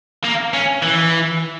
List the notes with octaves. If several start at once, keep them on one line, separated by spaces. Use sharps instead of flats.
A#3
C#4
E3